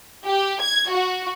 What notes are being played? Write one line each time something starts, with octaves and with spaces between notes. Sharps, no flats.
G4
G#6
F#4